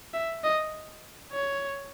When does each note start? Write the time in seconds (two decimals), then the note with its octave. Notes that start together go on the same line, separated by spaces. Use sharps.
0.14 E5
0.44 D#5
1.32 C#5